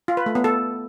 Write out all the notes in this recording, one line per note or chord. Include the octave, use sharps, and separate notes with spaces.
F4
B4
A3
B3
A4